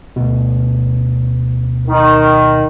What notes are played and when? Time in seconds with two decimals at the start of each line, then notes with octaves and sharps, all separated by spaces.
0.16 D2 B2
1.88 D#3